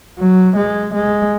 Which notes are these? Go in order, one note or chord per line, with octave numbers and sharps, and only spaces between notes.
F#3
G#3
G#3